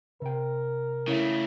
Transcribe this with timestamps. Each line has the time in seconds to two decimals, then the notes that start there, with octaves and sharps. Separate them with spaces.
0.22 C3 A#4 G5
1.08 C#3 A3 E4 C#5 F5